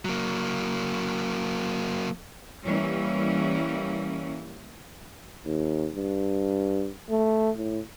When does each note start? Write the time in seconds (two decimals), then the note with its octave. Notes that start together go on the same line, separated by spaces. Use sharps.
0.05 F#3 A#3
2.65 E3 G3 A#3 C#4
5.45 D#2
5.95 G2
7.10 A3
7.57 A2